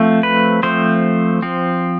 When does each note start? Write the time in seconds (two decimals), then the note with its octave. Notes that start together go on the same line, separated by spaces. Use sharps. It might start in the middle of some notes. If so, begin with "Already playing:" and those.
Already playing: F3 A3 C4
0.23 B4
0.63 F3 A3 C4 C5
1.43 F3 C4